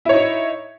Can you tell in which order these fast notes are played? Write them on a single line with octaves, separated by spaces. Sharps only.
E4 C#5 D#4